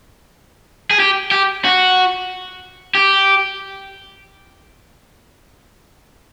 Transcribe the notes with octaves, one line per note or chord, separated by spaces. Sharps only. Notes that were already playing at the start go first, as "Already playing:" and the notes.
G#4
G4
G4
F#4
G4